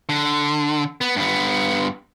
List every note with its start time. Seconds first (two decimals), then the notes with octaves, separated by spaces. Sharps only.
0.09 D3
1.01 B3
1.16 G2 B3